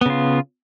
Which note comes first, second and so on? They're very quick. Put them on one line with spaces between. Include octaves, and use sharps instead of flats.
B3 C#3 F4